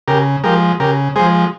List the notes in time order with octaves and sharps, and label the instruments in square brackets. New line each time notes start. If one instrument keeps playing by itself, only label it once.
[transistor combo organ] C#3 G4 A#4
F3 G#3 G4 A#4
C#3 G4 A#4
F3 G#3 G#4 C5